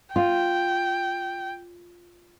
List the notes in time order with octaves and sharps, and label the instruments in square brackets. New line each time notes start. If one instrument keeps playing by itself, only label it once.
[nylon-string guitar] F4 [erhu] G5